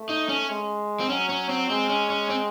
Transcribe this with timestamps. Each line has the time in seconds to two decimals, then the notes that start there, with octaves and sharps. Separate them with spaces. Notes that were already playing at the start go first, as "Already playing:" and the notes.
Already playing: A3
0.09 D#4
0.29 C#4
0.49 G#3
1.00 C4
1.09 F#3 C#4
1.29 C#4
1.49 C4
1.70 G#3 C4
1.89 C#4
2.10 C#4
2.30 C4